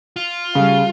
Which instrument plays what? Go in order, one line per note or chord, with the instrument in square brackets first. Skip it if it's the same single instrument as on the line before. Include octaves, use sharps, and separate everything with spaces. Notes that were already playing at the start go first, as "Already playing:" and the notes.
[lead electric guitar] F4
[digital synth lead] C#3 [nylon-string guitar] G3 A3 G#4 [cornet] F5